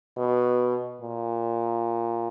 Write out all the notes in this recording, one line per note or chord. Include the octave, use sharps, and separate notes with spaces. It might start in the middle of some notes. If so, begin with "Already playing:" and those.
B2
A#2